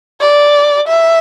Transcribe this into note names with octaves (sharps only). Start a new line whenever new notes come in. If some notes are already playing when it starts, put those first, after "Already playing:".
D5
E5